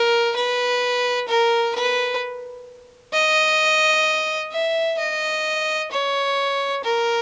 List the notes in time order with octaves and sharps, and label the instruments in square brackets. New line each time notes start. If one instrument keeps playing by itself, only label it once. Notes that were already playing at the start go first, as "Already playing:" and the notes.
Already playing: [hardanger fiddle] A#4
B4
A#4
B4
D#5
E5
D#5
C#5
A#4